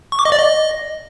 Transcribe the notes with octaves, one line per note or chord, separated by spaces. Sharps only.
C#6
D6
D#5
D5
D#5